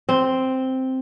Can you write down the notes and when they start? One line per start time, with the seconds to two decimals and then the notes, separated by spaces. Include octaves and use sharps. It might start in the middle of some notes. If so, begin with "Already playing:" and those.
0.09 C4